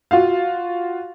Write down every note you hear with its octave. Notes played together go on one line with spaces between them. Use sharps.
F4 F#4 F5